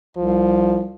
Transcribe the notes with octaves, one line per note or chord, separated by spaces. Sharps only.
C2 F3